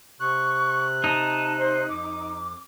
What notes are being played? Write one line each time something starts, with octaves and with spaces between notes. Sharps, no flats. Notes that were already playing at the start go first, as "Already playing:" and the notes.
C3 C#6 F#6
D#4 A5
C5
F2 D6